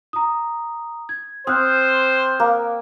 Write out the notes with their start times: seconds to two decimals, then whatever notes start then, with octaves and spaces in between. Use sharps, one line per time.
0.13 A#5 D#6
1.09 G#6
1.47 C4 C5 D#6 F6 F#6
2.40 A#3